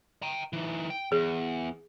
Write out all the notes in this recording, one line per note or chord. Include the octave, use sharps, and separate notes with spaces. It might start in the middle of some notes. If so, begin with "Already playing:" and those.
G5 A#5
E3 D#4
G5
E2 G#4